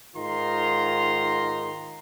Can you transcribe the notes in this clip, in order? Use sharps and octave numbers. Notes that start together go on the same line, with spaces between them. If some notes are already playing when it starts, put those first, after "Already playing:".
G#2 D#3 F4 A#5 C6